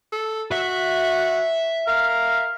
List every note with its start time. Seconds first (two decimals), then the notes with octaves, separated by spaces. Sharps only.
0.13 A4
0.52 F#4 E5
1.87 A#4 F5